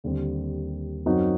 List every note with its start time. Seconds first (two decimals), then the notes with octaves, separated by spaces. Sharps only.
0.04 D#2 D3 G3 C4
1.06 F#2 F#3 C4 D#4 F#4